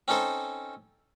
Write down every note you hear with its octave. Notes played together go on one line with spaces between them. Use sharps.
C4 C#4 D#4 A4 C5